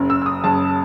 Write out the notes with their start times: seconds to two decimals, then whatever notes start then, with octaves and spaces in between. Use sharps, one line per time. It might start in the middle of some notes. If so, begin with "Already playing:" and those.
Already playing: F#1 F#2 C#3
0.10 E6
0.22 E6
0.26 D#6
0.44 F#1 F#2 C#3 A5